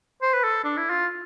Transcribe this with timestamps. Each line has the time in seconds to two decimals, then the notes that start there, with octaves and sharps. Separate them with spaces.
0.22 C5
0.34 B4
0.44 A4
0.64 D4
0.77 E4
0.90 F4